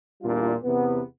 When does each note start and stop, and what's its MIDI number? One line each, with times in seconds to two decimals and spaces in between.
0.23 0.53 40
0.23 0.53 46
0.23 0.53 55
0.23 0.53 62
0.23 0.53 65
0.64 1.00 40
0.64 1.00 48
0.64 1.00 59